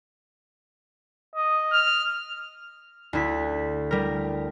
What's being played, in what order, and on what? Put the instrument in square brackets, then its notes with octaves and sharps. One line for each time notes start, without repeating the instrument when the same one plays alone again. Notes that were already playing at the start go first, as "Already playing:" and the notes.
[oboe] D#5
[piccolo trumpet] F6
[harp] D2 E4 B6
G3 A#4